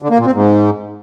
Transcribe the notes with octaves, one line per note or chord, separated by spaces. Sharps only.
D3
A#3
A#2
C4
G#2